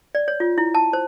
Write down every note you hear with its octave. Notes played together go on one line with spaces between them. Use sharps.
D5
C#5
F4
E4
A5
C5